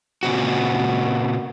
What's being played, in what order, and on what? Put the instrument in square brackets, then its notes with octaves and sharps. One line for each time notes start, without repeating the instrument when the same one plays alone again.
[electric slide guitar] A#2 C#3 C4 F#4